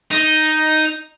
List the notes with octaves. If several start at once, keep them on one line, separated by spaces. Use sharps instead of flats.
D#4